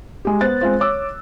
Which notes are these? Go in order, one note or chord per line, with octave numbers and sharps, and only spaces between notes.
G#3 G4
B3 C5 F#6 A6
G#3 C4 F4 C5
C#5 D6 E6